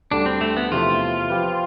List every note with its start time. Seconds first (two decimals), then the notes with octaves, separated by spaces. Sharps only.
0.11 D2 D3 G3 D4
0.26 C4
0.41 A3
0.57 B3
0.72 E2 C3 F3 A3 F4
1.30 F3 C4 G4 B4